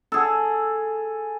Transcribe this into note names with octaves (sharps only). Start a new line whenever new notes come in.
G#4 A4